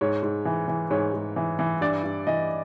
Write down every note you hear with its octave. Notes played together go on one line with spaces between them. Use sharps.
G#2 C#5
G#2
E3
E3
G#2 C#5
G#2
E3
E3
G2 D5
G2
E3 D#5